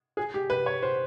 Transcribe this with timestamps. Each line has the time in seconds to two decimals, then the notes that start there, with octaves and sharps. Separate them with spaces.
0.17 G#4
0.34 G4
0.50 B4
0.66 C#5
0.83 C5